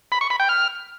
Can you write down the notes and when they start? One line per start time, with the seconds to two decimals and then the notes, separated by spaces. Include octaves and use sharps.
0.12 B5
0.21 C#6
0.30 B5
0.40 G5
0.49 F6